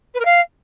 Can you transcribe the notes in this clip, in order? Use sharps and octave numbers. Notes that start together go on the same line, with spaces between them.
B4
A#4
F5